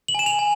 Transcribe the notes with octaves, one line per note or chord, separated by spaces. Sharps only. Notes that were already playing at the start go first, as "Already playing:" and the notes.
F#7
G#5 E7
F7
G#5